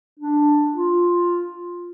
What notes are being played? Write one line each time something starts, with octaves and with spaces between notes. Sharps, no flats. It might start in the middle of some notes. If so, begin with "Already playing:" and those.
D4
F4